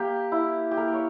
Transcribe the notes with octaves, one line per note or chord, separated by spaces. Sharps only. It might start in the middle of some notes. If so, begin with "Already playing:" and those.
Already playing: A#3 G4
E4
G4
A#3 A#4
C#5